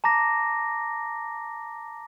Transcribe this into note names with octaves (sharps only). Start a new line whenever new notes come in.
A5 A#5 D6 A#6